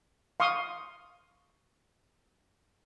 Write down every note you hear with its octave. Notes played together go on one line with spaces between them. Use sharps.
F5 C6 C#6 D#6